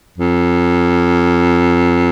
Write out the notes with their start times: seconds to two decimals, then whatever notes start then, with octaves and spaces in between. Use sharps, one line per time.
0.18 F2